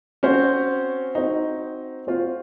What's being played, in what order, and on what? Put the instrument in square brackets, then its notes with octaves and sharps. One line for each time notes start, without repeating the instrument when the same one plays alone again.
[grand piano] C4 F#4 C5 [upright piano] C#4
[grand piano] C4 F#4 C5 [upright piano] D#4
[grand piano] C4 F#4 C5 [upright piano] F4